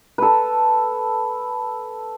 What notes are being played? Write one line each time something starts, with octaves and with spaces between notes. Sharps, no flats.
A4 B4